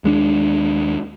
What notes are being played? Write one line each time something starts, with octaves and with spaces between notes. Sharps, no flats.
D#2 G#3 C#4 D4